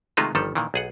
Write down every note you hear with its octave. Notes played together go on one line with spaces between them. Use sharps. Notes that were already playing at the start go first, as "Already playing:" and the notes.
C3 D#3 G#3 A3 D#4 F4
G1 D#3 F3 G3 A4
A#2 D#3 E3
B1 G#4 F#5